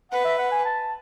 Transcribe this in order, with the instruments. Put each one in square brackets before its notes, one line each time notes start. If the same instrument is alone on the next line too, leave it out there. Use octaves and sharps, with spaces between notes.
[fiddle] B4 [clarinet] F#5
[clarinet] E5
F#5
G#5
A5